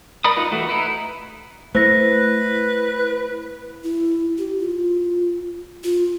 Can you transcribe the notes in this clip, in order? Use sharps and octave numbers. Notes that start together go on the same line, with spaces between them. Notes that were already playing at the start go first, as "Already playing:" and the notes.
A#4 D5 B5 D#6
D#4 F4 B4
E3 A3 F#4
D#4 E4 B4
A3 E4 B4 C5 A#6
E4
G4
F4
F4